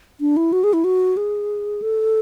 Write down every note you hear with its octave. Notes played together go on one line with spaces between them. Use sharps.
D4
E4
F#4
G#4
E4
F#4
G#4
A4